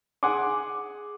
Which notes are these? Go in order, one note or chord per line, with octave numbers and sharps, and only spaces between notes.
G#4 F#5 G#5 C6 D6